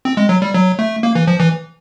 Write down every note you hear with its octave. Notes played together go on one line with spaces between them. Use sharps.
C4
G#3
F#3
G3
F#3
A3
A#3
E3
F3
E3